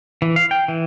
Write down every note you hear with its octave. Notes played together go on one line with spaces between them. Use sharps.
E3
F5
G5
E3